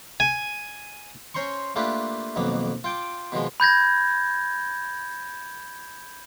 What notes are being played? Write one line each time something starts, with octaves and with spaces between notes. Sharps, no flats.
G#5
C#4 C5 A#5 C6 C#6
A3 A#3 D4 F4 G4 B4
B1 F2 D#3 A#3 B3
F4 G5 D6
B2 D#3 F3 G#3
B5 G6 G#6 A#6